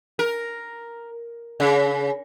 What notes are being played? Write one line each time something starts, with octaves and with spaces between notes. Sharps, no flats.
A#4
C#3